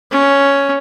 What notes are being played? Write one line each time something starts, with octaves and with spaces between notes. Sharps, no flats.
C#4